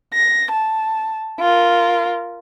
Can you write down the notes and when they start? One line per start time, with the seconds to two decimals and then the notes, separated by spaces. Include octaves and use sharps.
0.13 A#6
0.51 A5
1.40 F4 A#4